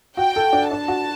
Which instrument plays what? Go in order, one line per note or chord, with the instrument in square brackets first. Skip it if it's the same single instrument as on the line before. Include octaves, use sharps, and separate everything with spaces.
[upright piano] F#4 [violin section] G5
[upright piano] A4
D4
[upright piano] D4 [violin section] A5
[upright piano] F#4